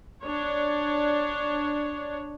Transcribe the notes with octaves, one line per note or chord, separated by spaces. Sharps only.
D4 C#5